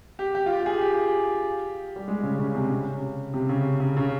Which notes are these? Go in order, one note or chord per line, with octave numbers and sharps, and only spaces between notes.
G4
G4
F4
G4
G4
G#4
G4
G3
G#3
C#3
C#3
C3
C#3
C3
C#3
C#3
C#3